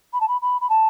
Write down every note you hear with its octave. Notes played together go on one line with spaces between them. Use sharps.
B5
A5
B5
B5
B5
A5